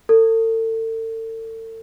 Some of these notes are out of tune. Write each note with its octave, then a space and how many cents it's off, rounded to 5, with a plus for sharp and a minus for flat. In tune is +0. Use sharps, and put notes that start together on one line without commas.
A4 +35